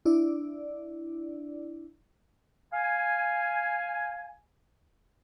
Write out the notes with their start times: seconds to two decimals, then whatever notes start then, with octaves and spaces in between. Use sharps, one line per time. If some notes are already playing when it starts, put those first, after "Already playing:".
0.05 D4 E4 D5
2.73 F5 G#5